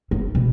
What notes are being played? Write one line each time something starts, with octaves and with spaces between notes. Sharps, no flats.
E3
B2